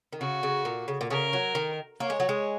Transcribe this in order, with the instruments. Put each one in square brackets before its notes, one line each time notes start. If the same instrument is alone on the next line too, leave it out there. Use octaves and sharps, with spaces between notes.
[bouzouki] D#3
[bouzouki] C#3 [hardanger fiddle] F#4
[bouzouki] C#3
A#2
C#3
A#2
[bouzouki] C#3 [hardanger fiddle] A#4
[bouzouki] F#3
D#3
[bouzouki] A#3 [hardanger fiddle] C#5
[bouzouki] G#3
F#3
G#3